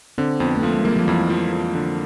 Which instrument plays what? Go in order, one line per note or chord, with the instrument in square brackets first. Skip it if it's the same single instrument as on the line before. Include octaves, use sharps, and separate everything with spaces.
[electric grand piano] D3 [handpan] C4
[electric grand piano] F2 [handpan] B3
[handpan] A3
[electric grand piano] F3 [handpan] A#3
[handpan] G#3
[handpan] G3 [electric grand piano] A#3
[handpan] F3
[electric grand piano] F2 [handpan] E3
[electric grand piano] F3
F2
D3